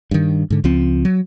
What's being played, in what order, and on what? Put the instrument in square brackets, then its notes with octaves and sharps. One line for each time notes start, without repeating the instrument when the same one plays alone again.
[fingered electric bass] G2 D#3
G#2 D3
C#2 F3 C4
F#3